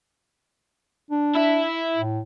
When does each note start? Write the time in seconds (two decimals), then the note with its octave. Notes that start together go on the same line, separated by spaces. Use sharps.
1.11 D4
1.35 E4 E5
1.96 A2